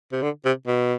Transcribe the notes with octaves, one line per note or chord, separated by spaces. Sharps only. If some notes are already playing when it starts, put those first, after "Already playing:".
C3
D3
C3
B2